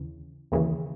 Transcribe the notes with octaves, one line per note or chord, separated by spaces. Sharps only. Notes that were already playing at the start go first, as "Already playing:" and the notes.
Already playing: D#2 C#3 E3
D#2 C#3 E3